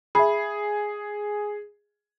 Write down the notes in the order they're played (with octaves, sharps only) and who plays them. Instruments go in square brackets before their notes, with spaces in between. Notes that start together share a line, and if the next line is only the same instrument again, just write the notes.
[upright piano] G#4 [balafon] E5 B5